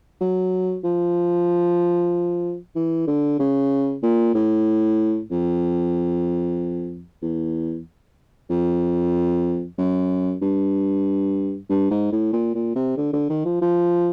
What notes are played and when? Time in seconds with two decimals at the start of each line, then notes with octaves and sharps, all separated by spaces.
0.21 F#3
0.84 F3
2.76 E3
3.08 D3
3.40 C#3
4.03 A#2
4.35 A2
5.31 F2
7.22 E2
8.50 F2
9.78 F#2
10.42 G2
11.70 G2
11.91 G#2
12.12 A2
12.33 A#2
12.55 A#2
12.76 C3
12.97 D3
13.13 D3
13.29 D#3
13.46 F3
13.62 F3